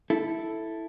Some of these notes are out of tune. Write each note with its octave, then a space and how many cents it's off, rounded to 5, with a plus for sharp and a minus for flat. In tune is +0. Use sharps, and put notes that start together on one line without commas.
E4 +0 A4 +0